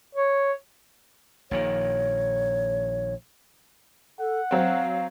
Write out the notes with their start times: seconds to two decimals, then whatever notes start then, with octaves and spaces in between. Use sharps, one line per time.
0.15 C#5
1.51 A#1 A#2 D#3 C#5
4.19 A4 F#5
4.51 F#3 C4 F5